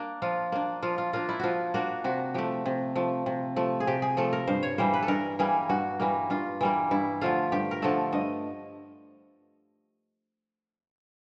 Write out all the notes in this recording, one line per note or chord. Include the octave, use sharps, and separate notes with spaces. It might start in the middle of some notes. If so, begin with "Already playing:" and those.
Already playing: A#3 D4
F3 F4
A#3 D4
F3 F4
F4
A#3 D4 F4
E4
F3 F4 F#4
A#3 D4 F#4
C3 F#4
F3 A3 G4
C3
F3 A3
C3
F3 A3
G#4
C3 G4
G#4
F3 A3 A4
A#4
G2 C5
C#5
E3 G3 A#3 C5
B4
A4
G2 A#4
E3 G3 A#3 G#4
G2 F#4
E3 G3 A#3
G2 F4
E3 G3 A#3
G2 E4
D3 F3 A3 F4
G2 G4
A#4
D3 F3 A3 A4
G2 D#5